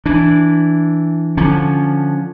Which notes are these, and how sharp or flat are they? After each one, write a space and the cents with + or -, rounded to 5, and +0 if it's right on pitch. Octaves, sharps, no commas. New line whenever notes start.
E3 +0 D4 -5
D3 +0 F3 +0 C#4 +0